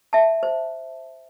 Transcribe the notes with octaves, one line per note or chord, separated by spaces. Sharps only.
E5 A5
C5